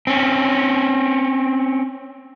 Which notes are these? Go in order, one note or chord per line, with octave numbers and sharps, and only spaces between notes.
C4 C#4